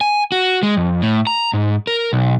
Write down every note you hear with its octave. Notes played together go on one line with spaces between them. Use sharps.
G#5
F#4
G#3
F2
A2
A#5
G#2
A#4
B1